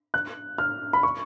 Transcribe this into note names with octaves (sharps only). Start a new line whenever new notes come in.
F#6
F6
B5
C#6